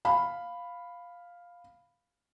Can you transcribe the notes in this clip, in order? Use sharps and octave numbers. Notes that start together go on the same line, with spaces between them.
F5 B5